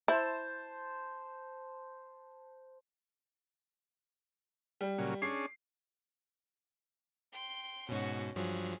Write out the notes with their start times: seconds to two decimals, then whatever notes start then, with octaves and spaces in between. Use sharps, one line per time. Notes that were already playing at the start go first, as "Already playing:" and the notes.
0.08 E4 C5 A5
4.81 G3
4.98 A#2 C#3 F#3
5.22 C#4 D4 G#4 C7
7.33 G5 C6
7.89 G#2 B2 C#4 F#4
8.36 G2 F3 F#3 G#4